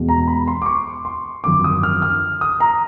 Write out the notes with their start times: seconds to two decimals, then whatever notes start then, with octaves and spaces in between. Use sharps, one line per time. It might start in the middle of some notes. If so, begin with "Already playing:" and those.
Already playing: E2 B2 G#3
0.09 A#5
0.28 B5
0.47 C6
0.62 D6
0.66 C#6
1.05 C6
1.44 G#1 F#2 D3 F3 D6
1.64 D#6
1.83 F6
2.02 F6
2.41 D#6
2.60 A#5